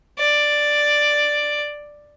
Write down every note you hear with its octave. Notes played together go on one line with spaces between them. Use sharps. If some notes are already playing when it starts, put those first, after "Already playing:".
D5